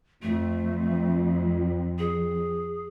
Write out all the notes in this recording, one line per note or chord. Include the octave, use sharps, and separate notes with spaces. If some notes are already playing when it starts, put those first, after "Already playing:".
F2 A3
G#4